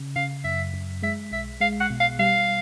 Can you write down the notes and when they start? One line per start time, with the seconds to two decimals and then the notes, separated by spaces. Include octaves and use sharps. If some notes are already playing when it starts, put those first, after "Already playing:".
Already playing: C#3
0.16 C#3 F5
0.44 F#2 E5
0.74 F#2
1.03 G#3 E5
1.31 B1 E5
1.60 G#3 F5
1.80 F#5
1.90 B2
2.00 F5
2.19 G3 F5